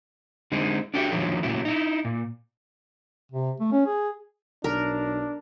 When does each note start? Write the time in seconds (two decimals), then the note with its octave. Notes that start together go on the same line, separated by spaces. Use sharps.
0.52 D3 G#3 C4 D#4
0.94 D4 F#4 G4 A4 D#5 E5
1.12 A#2 D3 D#3 F3 F#3
1.43 A#2 C#3 F#3 A3 E4
1.65 D#4 E4
2.05 A#2
3.32 C3
3.60 A3
3.72 C#4
3.86 G#4
4.64 B1 D4 A#4